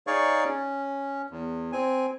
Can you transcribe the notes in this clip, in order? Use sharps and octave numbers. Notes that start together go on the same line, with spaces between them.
D#4 G#4 C#5 D5 F5 C#6
C#4
E2
C4 G#5